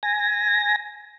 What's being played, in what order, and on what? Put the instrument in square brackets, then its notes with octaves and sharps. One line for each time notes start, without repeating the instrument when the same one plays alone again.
[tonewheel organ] G#5 A#6